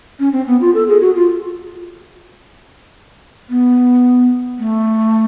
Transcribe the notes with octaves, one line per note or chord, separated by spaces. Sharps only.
C#4
C4
B3
F4
A4
G#4
F#4
F4
B3
A3